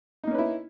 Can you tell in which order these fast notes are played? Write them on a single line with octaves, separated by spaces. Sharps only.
D#4 A#3 C#4 B4 E4